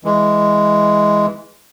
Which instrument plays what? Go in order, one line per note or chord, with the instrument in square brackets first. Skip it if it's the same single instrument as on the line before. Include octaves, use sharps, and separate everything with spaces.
[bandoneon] E3 G#3